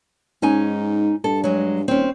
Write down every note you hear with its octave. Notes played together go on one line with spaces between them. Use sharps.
G#2 C#4 D#4 G#5
G2 A4
F#3 G#3
D#1 C4 C#4